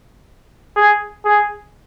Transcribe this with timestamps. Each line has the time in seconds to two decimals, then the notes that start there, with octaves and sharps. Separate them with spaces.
0.76 G#4
1.25 G#4